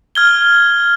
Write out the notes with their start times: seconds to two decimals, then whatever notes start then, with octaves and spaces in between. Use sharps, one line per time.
0.15 F6 G#6 G7